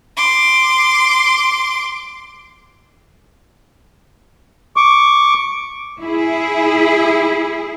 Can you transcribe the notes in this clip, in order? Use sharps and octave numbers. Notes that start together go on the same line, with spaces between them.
C6 D6
C#6 D6
E4 G#4